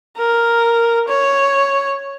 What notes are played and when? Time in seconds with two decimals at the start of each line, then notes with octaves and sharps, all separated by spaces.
0.17 A#4
1.08 C#5